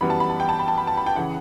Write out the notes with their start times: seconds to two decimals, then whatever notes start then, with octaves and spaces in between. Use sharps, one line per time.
0.01 F#2 E3 G3 B3 B5
0.10 A5
0.20 B5
0.30 A5
0.40 G5
0.49 A5
0.59 B5
0.68 A5
0.78 B5
0.87 A5
0.97 B5
1.06 G5
1.16 C#3 E3 F#5